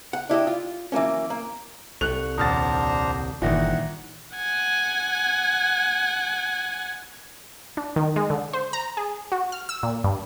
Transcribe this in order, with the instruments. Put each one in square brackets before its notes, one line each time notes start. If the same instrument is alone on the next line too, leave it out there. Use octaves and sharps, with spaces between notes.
[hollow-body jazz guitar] F#5
D4 E4 G4 D#5
F4
E3 F#3 A#3 C#4
A#3
[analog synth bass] C2 [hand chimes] A4 [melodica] C#6 [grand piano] F#6 F7
[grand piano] D#1 F6 A6 [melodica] D4 C5 A#5 [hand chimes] F#5 D#6
[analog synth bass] G1 [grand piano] A#2 D#3 E3 [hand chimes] E5 A#6 [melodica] F#5
[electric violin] F#5 G#5
[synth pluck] D4
D#3
G#3
D3
C5
A#5
G#4
F#4
F6
E6
A#2
G2